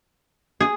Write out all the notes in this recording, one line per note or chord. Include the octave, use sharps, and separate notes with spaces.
G#4